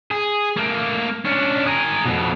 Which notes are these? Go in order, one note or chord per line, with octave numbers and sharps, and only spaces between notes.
G#4
A3 A#3
C#4 D4
G#4 A#4
F2 B2